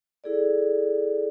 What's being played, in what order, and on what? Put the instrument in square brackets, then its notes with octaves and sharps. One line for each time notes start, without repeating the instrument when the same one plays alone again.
[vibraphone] E4 G#4 A4 D5